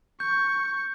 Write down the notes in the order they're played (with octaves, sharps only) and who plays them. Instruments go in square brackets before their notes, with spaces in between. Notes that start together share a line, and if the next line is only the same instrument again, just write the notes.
[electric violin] C#6 [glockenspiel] G6